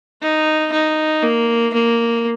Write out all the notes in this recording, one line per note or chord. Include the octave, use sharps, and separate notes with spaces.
D#4
D#4
A#3
A#3